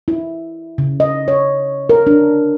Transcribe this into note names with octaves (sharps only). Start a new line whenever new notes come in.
E4
C#3
D#5
C#5
A#4
D4